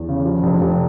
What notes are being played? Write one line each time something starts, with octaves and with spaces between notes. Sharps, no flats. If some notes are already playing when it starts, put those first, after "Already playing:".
Already playing: E2
C#3
F3
F1
F1